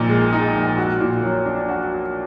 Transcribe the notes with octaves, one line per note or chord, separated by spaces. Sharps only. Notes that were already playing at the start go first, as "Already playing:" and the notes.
Already playing: A#1 A#2 D#4
G#3
D#4
A#1
F#4
A#2
F#3
D4
F#4